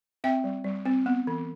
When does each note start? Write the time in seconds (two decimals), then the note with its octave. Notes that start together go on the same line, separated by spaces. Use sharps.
0.24 C4 E5 G5
0.44 G3
0.64 G3
0.85 C4
1.06 B3
1.27 E3